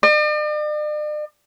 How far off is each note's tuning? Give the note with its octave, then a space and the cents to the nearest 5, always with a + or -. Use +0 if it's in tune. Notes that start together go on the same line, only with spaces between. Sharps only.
D5 +45